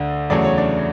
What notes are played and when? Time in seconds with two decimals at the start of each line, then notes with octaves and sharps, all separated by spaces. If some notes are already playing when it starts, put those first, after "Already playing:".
Already playing: D2 D3
0.30 E2 C#3 F#3 A3 D5
0.44 C#5
0.58 D4 D5